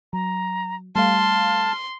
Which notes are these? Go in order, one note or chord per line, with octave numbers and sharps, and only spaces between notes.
F#3 A#5
G3 A3 F5 A5 C6 F6